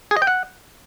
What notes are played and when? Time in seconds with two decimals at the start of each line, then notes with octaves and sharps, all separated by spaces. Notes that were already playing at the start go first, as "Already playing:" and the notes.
0.11 G#4
0.16 D#5
0.22 G5
0.27 F#5